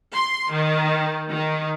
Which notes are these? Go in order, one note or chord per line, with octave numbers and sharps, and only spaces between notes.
C6
D#3
D#3